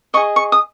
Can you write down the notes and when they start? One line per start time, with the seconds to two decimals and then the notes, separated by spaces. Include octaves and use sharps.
0.14 D#5 C#6
0.17 G#4
0.36 C#6
0.52 D#6